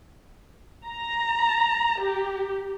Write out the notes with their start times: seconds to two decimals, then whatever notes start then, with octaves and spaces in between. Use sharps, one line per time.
0.86 A#5
2.02 G4